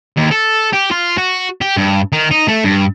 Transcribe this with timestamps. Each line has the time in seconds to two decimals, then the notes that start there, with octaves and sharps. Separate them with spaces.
0.17 D#2
0.31 A4
0.73 G4
0.91 F4
1.18 F#4
1.61 G4
1.77 G2
2.12 D#3
2.31 D#4
2.48 A3
2.64 G2